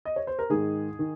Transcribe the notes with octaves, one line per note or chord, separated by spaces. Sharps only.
D#5
C#5
C5
A#4
G#2 D#3 G#4
D#3